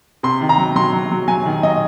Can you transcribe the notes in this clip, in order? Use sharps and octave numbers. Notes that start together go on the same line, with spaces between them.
C3 C6
D#3
A#5
F#3
F#3 C6
F#3
F#3
F#3 G#5
D#3
F#3 D#5